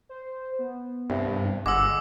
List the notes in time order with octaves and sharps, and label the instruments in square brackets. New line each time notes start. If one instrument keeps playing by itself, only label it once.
[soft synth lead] C5
B3
[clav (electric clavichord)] C2 [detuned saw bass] G2
[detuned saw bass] G1 [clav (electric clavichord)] G#3 [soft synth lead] F#5 [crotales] D6 E6